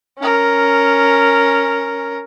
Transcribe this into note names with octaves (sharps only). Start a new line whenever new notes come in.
C#4 A#4